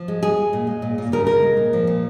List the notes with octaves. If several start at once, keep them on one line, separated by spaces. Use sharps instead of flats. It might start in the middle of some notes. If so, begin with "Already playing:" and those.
Already playing: F3
G#3
G#3 G#4
G#3
A#2
G#3
A#2
A#2
C#3 A#4
G#3 A#4
G#3
A#2
F3
A#2